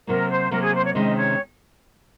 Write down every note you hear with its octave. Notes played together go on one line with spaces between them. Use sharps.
C3 F#3 A#3 A#4
C5
C3 F#3 A#3 A#4
G#4
C5
C#5
C3 D#3 G#3 C#4 D#5
C#5